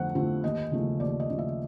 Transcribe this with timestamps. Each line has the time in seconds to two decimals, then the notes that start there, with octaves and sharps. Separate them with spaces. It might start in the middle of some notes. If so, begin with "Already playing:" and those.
Already playing: F2 D3 F3 A3 C4 F#5
0.15 D3 F3 A3 C4
0.44 D#2 D#5
0.72 C#3 F3 A3
1.00 D#2 D5
1.20 D#5
1.29 C#3 F3 A3
1.39 E5